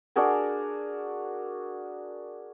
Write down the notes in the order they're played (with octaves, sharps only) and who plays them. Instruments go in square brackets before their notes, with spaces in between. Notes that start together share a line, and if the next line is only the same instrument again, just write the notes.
[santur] D4 F#4 G#4 A#4